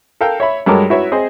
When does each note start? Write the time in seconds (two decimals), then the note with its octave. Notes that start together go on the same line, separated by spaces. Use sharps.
0.21 A4 A#4 F5 G5
0.40 C#5 E5 B5
0.66 G2 F#3 G#3 A4 A#4 D6
0.90 E4 F#4 B4 C#5 E5
1.12 C4 G#4 C5 D#5